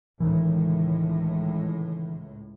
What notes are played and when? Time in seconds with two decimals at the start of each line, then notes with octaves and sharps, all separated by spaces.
0.20 C#2 A2 D#3 E3